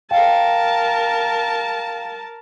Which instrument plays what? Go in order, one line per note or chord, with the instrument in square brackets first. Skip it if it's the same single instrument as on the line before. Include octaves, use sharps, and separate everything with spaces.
[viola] A#4 A5 [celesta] F5 G5